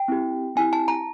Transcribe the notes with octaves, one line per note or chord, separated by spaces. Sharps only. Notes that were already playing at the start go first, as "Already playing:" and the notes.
Already playing: G5
C4 E4 G4
C4 E4 G4 G#5
A5
A#5